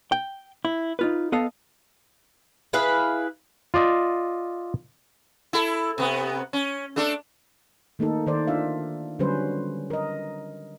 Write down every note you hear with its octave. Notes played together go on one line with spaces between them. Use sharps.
G5
E4
D#4 F4 B4
B3 A4 D#5 F5
E4 G#4 B4 F5
F4 D5 D#5
E4 A4
C3 B3
C#4
A3 D4 A4
D#3 A3 A#3 D#4 A4
D#3 C5 D5
D4 F4 E5 F5
D3 F#3 G3 C#4 B4 C5
A#4 D#5